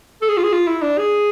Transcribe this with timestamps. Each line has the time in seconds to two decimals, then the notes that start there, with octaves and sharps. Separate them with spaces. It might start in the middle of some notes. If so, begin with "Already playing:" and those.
0.22 A4
0.29 G#4
0.37 F4
0.44 G#4
0.53 F4
0.67 E4
0.82 D4
0.98 G#4